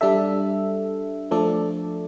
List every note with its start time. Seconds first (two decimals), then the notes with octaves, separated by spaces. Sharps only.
0.01 G3 D4 A4 E5
1.31 F3 A3 D4 A4 D5